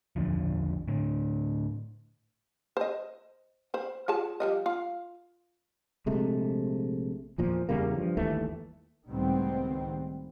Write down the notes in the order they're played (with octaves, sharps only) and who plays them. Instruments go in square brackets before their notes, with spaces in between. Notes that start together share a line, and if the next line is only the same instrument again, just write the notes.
[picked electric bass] A#1 E2 D3 F3
A2 D3
[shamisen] C5 D#5
C5 B5
F4 G#4 A5
F3 G3 D#5
F4 F5
[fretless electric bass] A#1 C3 G#3 A3
E2 A#2 F3
E2 C#3 G3 A#3
G2 F3
G1 D#2 E3 A3
[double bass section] C#2 A2 D#3 G3 B3 C4